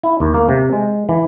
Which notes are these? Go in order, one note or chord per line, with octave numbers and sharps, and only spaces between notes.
E4
D#2
A#3
C3
G#3
E3